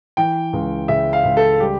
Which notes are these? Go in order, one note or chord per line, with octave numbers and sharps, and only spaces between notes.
E3 G5
C#2
C#3 E5
F5
C#2
A4
G3 G4